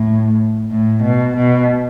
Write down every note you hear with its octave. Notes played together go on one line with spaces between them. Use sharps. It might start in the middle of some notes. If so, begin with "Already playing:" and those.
Already playing: A2
A2
B2
B2